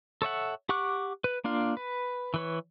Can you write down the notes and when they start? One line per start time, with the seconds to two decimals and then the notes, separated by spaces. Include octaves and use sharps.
0.22 A4 C#5 E5 F#5
0.69 G4 F#5 C#6 D6 F#6
1.24 B4
1.44 A#3 D4 F4 F5
1.77 B4
2.34 E3 B4 C#5